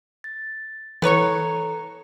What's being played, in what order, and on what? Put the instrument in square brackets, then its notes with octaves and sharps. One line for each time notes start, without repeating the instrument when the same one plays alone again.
[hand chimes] A6
[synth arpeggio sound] E3 C#6 [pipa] B3 B4 C#5 [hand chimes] A4 A#5